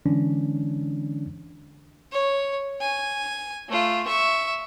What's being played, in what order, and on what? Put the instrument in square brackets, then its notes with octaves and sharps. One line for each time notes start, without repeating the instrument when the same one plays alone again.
[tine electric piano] D3 E3 G#3 C#4 D4
[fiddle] C#5
G#5
A3 F4
E5 C#6